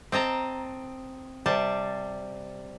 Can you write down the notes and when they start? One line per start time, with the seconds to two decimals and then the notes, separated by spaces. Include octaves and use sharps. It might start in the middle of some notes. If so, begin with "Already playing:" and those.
0.12 C4 D#5 A5 A#5
1.46 C3 G3 C5 A5